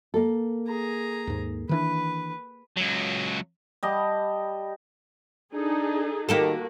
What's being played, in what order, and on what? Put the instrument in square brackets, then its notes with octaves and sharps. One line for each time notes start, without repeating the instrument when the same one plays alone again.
[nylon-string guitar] A#3 A4
[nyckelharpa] G#4 A#5
[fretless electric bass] D#2 G#2
[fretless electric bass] D#3 E3 D4 [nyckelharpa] B4
[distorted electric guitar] C#2 F#3
[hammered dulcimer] G3 D#5 A5
[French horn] D4 [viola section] D#4 G#4 A4
[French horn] D#3 [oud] A#3 G4 A4 [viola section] F#4